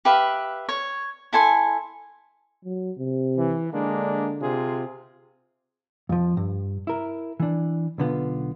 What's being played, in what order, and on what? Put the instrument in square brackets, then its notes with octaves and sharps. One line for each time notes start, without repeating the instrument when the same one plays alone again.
[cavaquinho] G4 B4 E5 F5
C#5
E4 A4 G#5 C6
[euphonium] F#3
C3
[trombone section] E3
[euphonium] D3 [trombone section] G#3 A#3 D4
[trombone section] C3 F4 G#4
[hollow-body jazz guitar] F2 F3
G2
E4 A#4
E3 D4
B1 D3 B3 F4